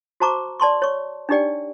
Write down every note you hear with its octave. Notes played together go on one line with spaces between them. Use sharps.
F#4 C5 A5 A#5 C#6 D6
D5 A5 C6 C#6
C#5 C#6
D4 D#4 G4 D5 G5